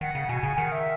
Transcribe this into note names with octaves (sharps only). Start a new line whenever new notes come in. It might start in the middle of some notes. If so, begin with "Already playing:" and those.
D#3 F#5
C#3
B2 G#5
C#3
D#3 F#5
E5